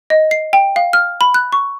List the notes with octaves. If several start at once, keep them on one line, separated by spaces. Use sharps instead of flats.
D#5
C7
G5
F5
F6
B5
F#6
C#6